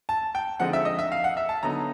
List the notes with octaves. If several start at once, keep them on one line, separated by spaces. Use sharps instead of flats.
A5
G5
D3 F3 G#3 C4 D#4 F#5
E5
D#5
E5
F5
F#5
E5
A5
D3 F#3 B3 D#4 A#5